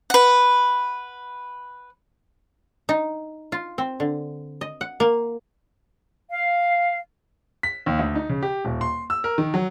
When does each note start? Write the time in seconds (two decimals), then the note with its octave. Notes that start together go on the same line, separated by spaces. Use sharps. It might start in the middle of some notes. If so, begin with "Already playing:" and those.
0.10 B4 F#5
2.89 D#4
3.52 F4
3.78 C4
4.00 D3
4.61 D#5
4.81 F#5
5.00 A#3
6.30 F5
7.63 B6
7.86 D#2
7.99 D2
8.15 D#4
8.29 C#3
8.43 G4
8.65 D#1
8.81 C6
9.10 E6
9.24 A#4
9.38 D#3
9.54 F#3